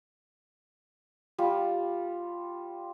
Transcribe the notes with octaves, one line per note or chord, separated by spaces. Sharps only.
G3 F4